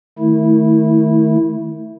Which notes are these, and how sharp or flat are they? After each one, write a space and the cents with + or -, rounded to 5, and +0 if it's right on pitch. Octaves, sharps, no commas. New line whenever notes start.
D#3 -5 A3 +0 E4 -20